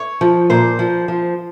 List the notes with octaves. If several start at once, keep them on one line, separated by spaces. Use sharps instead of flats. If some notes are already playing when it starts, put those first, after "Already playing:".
Already playing: C#5
F3
A#2 C5
F3
F3